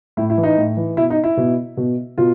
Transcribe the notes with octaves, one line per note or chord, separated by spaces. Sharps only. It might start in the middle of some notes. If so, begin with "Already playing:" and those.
A2 E4
E4
E3
D#4
A2
E3
B2 E4
D#4
E4
B2
B2
B2 F4